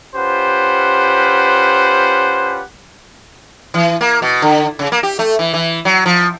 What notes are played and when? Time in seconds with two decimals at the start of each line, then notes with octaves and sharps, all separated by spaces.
0.15 C#4 F4 G4 B4 C5 F#5
3.74 E3
4.01 A#3
4.22 B2
4.42 D3
4.79 C#3
4.92 A#3
5.03 G4
5.19 A3
5.39 E3
5.54 E3
5.85 F#3
6.06 F3